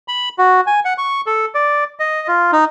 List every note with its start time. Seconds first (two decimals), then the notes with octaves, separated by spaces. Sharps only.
0.08 B5
0.38 F#4
0.67 G#5
0.85 F#5
0.98 C#6
1.27 A4
1.55 D5
2.00 D#5
2.28 F4
2.53 D#4